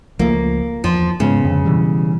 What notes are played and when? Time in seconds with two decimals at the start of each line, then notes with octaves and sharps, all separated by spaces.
0.19 C#2 F3 A3 A#3
0.84 E2 F3
1.20 G#2 C#3 G#3 B3
1.44 F2 D3
1.65 B2 E3 G3